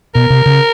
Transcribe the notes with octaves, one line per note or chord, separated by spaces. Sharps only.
B2 A#4
C3
C#3